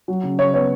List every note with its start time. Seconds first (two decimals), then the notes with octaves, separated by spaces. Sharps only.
0.08 F#3
0.23 C#3
0.38 C#3 C#5
0.54 B3 C#5